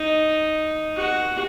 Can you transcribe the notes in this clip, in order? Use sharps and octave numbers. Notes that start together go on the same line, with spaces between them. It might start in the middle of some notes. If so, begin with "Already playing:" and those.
Already playing: D#4
F#4